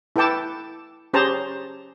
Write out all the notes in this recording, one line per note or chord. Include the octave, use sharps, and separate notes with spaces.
E4 A4 B4 G5 A5 D6
C#4 G4 G#4 C5 A5 A#5